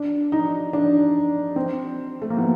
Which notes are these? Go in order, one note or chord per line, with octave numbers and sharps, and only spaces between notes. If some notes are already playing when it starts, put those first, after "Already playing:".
Already playing: D4
D#4
D4
C4
A3
A#3
B3